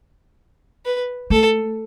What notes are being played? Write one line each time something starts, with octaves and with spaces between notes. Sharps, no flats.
B4
A3 A4